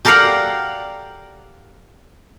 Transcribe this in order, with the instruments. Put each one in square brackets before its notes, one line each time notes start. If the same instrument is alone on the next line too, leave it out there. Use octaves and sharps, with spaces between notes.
[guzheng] G4 A4 A#4 D5 F5 F#5